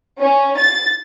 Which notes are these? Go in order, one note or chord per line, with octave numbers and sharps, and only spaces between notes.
C#4
A6